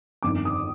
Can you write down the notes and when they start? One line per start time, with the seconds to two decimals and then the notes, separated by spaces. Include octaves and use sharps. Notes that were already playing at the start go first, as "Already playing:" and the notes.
0.23 G1 F2 D#3 D6
0.45 D#6